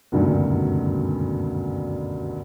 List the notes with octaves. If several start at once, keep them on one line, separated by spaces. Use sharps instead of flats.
F#1 D2 G2 B2 D3 D#3